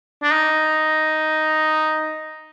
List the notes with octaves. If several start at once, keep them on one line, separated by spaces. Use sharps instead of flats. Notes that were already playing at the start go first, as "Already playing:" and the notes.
D4
D#4